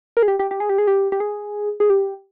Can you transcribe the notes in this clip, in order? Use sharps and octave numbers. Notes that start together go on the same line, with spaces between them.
A#4
G#4
G4
G4
G4
G#4
G4
G#4
G4
G4
G#4
G#4
G4